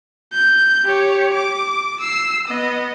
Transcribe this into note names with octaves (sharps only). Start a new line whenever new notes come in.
G6
G4 C#5
D6
E6 C7
B3 D#5